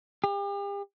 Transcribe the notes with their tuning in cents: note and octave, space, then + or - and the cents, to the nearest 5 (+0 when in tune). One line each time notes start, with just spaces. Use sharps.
G4 +40